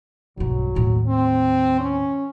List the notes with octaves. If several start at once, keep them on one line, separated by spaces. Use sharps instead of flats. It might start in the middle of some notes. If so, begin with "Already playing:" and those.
B1 G2 F#3
D#2 A2
C4
C#4